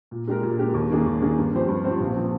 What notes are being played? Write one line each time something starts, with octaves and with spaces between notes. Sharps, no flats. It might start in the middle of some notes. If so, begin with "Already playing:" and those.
A#2
G#3 D4 G4 A#4
A#2
G#3 D4 G4 A#4
D#2
D#3 A#3 D4 G#4
D#2
D#3 A#3 D4 G#4
G2
F3 C4 G4 C5
G2
F3 C4 G4 C5
A#1
F3 C4